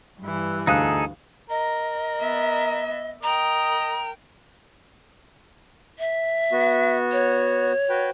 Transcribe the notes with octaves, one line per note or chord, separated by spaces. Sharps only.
G2 E3
D2 D#4 G#4 A4 F5 D#6 F#6
A#4 D#5
B3 E5
A#4 D#5 G5 A#5
E5
B3 F#4
C#5
F#4 B4 G5